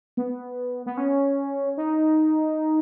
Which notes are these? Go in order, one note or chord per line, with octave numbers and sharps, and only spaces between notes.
B3
B3
C#4
D#4